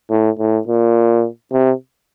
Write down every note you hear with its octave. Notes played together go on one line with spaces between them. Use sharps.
A2
A2
A#2
C3